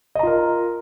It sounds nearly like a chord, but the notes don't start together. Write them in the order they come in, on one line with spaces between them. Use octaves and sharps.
D#5 A#5 F4 A#4